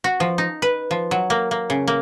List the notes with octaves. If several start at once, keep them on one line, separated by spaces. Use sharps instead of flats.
F#4
F3
D#4
B4
F3
F#3
A#3
A#3
C#3
A#3